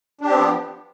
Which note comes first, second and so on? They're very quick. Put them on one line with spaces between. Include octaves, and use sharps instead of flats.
D4 G4 C4 B3 F3